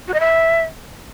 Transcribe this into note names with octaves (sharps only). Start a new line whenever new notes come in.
F#4
D#5
E5